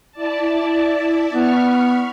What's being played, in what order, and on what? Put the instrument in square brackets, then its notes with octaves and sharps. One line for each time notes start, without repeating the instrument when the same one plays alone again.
[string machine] E4 D5 A5
[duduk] B3 [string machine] B5 C#6 F6